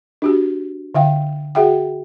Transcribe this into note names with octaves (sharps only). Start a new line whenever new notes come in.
D4 F#4 G4
D3 E5 F5 G5
F#4 G#4 E5 F#5 G5